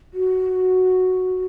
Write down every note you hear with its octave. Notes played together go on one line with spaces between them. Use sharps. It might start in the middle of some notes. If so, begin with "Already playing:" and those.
F#4